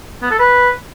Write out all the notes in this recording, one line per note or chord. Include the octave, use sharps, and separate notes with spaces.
B3
A4
B4